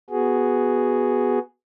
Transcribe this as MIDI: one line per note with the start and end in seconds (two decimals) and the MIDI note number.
0.10 1.39 59
0.10 1.39 66
0.10 1.39 68